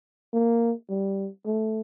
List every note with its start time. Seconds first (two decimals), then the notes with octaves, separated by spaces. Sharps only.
0.34 A#3
0.90 G3
1.46 A3